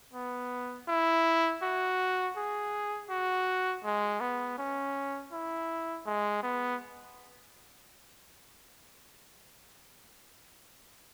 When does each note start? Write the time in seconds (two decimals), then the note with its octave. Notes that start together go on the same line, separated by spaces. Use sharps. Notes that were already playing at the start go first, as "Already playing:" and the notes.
0.14 B3
0.88 E4
1.62 F#4
2.37 G#4
3.10 F#4
3.85 G#3
4.21 B3
4.58 C#4
5.32 E4
6.06 G#3
6.43 B3